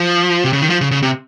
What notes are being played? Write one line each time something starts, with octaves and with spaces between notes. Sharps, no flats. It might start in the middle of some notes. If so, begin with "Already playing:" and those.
Already playing: F3
C3
C#3
D#3
F3
C#3
C#3
C3